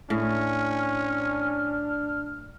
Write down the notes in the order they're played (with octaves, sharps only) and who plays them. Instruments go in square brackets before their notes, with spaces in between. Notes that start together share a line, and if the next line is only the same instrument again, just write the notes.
[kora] A2 [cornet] C#4 [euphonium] D4 [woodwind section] F6